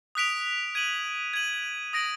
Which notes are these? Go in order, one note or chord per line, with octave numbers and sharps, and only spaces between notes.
D#6 F#6 B6 D7 F7
G#6 D#7 F#7
G#6 D#7 F#7
D#6 A#6 D7 F#7